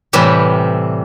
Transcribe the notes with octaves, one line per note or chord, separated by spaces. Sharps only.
A2 C3 E3 G3